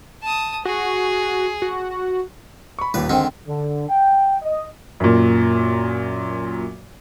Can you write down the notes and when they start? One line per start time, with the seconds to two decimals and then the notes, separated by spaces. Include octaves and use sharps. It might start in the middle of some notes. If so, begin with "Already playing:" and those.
0.23 A5 D#6
0.65 F#4 G#4
1.62 F#4
2.79 B5 C#6
2.94 D#1 D#2 B4
3.10 G#2 D3 D#3 C4
3.48 D3
3.89 G5
4.42 D#5
5.00 F#2 A#2